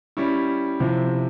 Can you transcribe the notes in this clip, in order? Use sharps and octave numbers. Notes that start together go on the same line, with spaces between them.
G3 C#4 E4
C3 F3 C4 E4